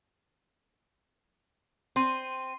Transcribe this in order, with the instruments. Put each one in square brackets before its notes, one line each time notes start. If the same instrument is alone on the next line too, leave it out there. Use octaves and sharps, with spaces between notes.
[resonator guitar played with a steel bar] C4 [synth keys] C6 D#7